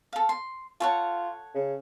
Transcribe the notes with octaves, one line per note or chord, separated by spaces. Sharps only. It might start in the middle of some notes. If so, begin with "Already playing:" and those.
A4 F5
C6
F4 A4 C#5 F#5
C#3